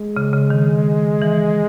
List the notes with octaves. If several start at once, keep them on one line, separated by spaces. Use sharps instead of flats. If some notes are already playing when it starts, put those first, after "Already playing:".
Already playing: G#3
C#3
C#3
D#3
E3